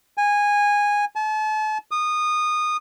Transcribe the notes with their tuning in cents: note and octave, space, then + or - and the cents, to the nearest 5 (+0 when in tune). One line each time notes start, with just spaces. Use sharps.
G#5 -15
A5 -40
D#6 -20